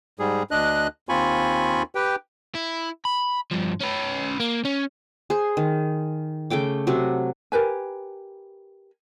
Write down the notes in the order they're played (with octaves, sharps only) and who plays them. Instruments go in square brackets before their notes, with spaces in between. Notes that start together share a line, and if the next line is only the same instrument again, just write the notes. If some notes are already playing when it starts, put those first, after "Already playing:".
[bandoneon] G#2 G3 G#4
D2 D4 D#5 F#6
D#2 C4 F4 G#5 B5 C#6
G4 B4 G5
[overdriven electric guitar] E4
B5
G2 F3
C#4 B4
A#3
C#4
[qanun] G#4 C5
D#3
C#3 A3 G5 D6
C3 F#3 F#4
[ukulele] G4 A#4 B4 G#5